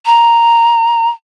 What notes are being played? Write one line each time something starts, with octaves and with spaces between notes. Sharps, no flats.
A#5